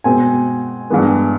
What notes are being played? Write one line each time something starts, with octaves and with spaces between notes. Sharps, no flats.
B2 G#3 C4 G#5
G2 E3 G#3 B3